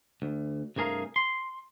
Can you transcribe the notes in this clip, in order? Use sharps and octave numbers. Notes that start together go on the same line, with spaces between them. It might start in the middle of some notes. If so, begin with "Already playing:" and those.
D2
C2 G2 A3 G#4 A#4 F5
C6